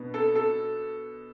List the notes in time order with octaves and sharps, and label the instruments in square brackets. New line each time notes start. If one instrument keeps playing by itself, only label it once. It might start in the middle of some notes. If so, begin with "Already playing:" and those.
Already playing: [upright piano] B2 B3 D4
A4
A4